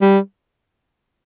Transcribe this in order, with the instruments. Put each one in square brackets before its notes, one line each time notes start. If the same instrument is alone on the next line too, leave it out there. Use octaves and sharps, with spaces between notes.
[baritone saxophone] G3